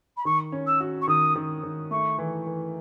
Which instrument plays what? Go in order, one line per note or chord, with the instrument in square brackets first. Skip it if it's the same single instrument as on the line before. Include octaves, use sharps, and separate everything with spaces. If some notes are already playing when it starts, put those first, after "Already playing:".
[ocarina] B5
[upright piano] D#3 [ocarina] C#6
[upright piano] C#4
[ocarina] E6
[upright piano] F#4
[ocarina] C#6
[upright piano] D#3 [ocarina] D#6
[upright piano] D#3
D#3
[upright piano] A3 [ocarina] C#6
[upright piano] E3
E3